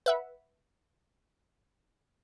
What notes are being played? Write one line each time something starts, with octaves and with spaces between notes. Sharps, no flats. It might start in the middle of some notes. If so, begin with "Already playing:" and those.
B4 E5 F#5